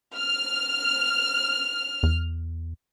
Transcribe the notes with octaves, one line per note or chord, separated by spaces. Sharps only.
F6
E2